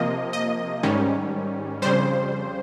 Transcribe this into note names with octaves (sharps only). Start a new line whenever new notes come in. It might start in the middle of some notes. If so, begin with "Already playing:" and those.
Already playing: C3 F3 A#3 D#5
D#5
G#2 D#3 G3 C#4
F2 C#3 G3 C5